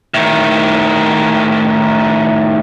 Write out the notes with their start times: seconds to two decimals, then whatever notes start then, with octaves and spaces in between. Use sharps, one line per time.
0.14 A2 D#3